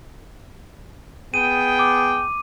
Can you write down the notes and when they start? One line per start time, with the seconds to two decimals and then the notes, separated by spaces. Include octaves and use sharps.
1.34 B3 G#4 G5 D#7
1.79 D6